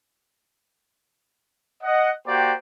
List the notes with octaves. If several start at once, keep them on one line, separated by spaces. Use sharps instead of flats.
D#5 F#5
A#3 F#4 G4 C5 D5 G5